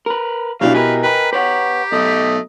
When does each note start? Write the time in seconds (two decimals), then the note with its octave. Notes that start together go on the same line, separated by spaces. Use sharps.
0.06 A#4 B4
0.61 B2 F#3 G3 D4 E4 G4 F5
0.75 A#4 B4 D#5 G#5
1.03 B4 G5 A#5
1.33 G4 B4 C#5 F#5
1.92 B1 A3 D#5